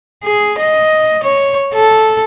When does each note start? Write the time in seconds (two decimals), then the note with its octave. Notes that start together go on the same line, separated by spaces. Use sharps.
0.24 G#4
0.59 D#5
1.24 C#5
1.74 A4